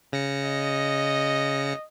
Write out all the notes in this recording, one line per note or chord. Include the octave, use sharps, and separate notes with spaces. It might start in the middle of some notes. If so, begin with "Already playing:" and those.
C#3 A#6 C#7
D#5